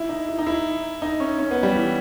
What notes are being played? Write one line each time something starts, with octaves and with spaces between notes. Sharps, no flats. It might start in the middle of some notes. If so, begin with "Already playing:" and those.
Already playing: E4
D#4
E4
D#4
E4
D#4
C#4
C#4
B3
G3
E3